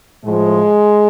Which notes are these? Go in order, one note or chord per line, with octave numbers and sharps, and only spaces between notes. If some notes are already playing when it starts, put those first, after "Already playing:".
A2 F3 G#3